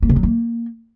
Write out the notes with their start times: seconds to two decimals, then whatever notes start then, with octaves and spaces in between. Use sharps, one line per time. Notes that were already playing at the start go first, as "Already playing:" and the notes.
0.03 A#3
0.09 C#3
0.16 F#3
0.23 A#3